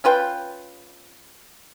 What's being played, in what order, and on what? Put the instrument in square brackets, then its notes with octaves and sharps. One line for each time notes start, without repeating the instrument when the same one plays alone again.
[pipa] C#4 F4 B4 G5